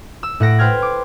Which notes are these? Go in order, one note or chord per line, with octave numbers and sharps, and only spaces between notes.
E6
A2 F#5 A#6 D7
B4 C5 G5 F6 G#6
D6